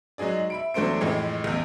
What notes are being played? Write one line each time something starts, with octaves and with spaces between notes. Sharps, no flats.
F#3 G#3 D#4 G#4 D5
E5 B5 D7
E2 F#3 A3 D4 C5 D7
F2 A2 E3 G#3
A1 E2